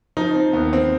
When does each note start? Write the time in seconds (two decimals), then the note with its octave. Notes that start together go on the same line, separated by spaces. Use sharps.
0.17 F3 D#4
0.35 C4
0.53 D#2 B3
0.73 C4